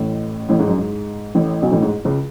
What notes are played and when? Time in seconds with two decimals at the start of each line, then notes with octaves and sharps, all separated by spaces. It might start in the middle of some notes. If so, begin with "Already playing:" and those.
Already playing: A1 A2
0.49 A1 A2
0.59 G#2
0.68 F#2
0.78 G#2
1.35 A1 A2
1.62 B1 B2
1.72 A1 A2
1.82 G#2
2.05 C#2 C#3